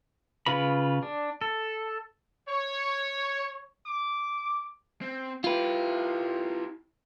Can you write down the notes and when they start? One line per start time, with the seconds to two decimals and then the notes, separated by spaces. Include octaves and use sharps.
0.46 C#3 F4 B4 B5
1.03 D4
1.41 A4
2.49 C#5
3.86 D6
5.01 C4
5.44 E4 F4 G4 B4